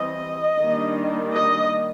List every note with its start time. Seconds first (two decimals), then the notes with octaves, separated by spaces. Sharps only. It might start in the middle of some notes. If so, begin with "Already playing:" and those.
Already playing: E3 G3 C4 D#5
0.61 D#3 G3 A#3 D4
1.35 D#5